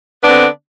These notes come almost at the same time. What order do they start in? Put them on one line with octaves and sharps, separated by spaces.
B3 D4 D3 C4